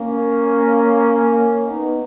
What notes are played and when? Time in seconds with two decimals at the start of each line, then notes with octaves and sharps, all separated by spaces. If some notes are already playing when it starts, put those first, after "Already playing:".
Already playing: A#3 C#4
1.66 B3 D#4